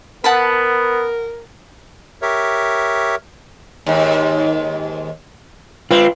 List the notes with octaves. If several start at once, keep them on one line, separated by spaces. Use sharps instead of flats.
B3 A#4 F#5 A5 B5
G4 A#4 C#5 E5
D#2 G#2
C4 F4 B4